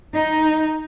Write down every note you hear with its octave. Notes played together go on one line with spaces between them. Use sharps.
D#4